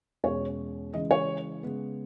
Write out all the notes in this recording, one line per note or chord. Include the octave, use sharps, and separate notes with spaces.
E2 B2 G#3 C#4 C#5
C#3 E3 G#3 D#5
C#5
C#3 G#3 B3